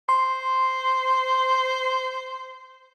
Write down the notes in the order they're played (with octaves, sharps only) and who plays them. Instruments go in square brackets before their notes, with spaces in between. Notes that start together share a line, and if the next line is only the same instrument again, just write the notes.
[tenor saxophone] C5 [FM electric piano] C6